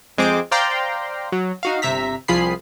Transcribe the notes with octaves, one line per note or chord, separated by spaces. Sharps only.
F2 G#3 C4 C5 D6
C5 D5 F5 G5 A#5 C6
F#3
D#4 F#4 F5
G1 C3 E5 A#5 B6
C2 F3 F4 G#4 B5 C7